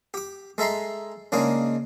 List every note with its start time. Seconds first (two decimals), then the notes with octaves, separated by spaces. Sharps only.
0.14 G4 D6
0.58 G#3 A4 E5 A#5 C6
1.32 C#3 G#3 A#3 D4 D#4